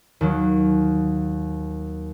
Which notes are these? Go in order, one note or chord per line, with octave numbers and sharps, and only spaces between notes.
D#2 F#3